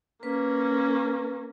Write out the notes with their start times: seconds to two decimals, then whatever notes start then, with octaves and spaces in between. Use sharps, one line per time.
0.23 A#3 C#4 B4